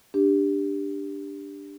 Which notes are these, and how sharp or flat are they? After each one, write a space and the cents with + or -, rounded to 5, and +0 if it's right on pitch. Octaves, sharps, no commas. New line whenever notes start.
D4 +0 G4 +10